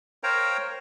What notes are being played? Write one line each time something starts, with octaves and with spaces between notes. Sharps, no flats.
A#4 C5 C#5 F5 G5 A#5